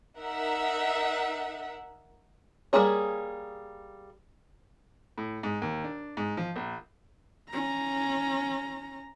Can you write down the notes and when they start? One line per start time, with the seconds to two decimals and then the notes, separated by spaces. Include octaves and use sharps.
0.18 D#4 A#4 E5 F#5
2.73 G3 A#3 D#4 G#4 C#5
5.18 A2
5.43 G#2
5.62 D#2
5.84 D4
6.17 G#2
6.37 F3
6.56 A#1
7.51 C#4 A#5